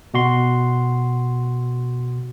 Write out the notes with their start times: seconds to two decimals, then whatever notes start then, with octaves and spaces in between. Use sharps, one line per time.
0.14 B2 F#4 C6